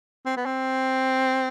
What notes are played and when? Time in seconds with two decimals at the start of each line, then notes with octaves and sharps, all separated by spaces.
0.26 C4
0.36 B3
0.45 C4